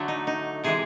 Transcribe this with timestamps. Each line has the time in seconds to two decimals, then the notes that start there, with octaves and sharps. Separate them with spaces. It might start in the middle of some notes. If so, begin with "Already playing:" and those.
Already playing: D3 F#3 A3
0.08 D#4
0.27 D#4
0.64 C3 E3 G#3 G#4